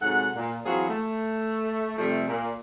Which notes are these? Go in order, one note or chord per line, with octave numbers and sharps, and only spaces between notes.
G#2 C3 F#3 A4 F#5
A#2
E3 F#3 C4 F4 F#4 G#4
A3
C3 F3 G3 A3
A#2